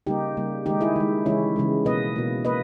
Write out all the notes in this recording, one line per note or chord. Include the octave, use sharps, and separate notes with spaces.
C#3 G3 A#3 D#4 G4
C#3 G3 A#3
D#3 G#3 D#4 G4
E4 G#4
D#3 G#3
C#3 E3 G#3 C#4 E4
C#3 E3 G#3
B2 A#3 B4 D#5
B2 A#3
A#3 B4 D#5